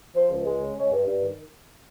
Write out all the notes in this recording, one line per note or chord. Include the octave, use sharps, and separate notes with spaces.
F3 C5
C#2
G#3
C#3
G#3 C#5
G2
G2
D#3